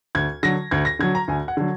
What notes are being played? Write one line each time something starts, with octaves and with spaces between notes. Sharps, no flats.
D2 G#6
D3 F#3 A#6
D2 G#6
A#6
D3 F#3 G#6
A#5
D2 G#5
F#5
D3 F#3